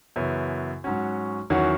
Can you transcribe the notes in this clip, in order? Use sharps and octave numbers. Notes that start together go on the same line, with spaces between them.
F#2 C#3 E3 B3 E4
G#2 F#3 C#4 F#4
E2 D#3 F#3 C#4 F#4